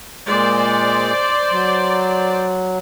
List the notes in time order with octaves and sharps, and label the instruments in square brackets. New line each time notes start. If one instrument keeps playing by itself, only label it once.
[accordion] A#2 G#3 [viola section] C5 D5
[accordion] F#3